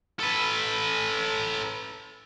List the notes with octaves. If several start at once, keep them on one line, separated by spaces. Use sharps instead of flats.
A4 B4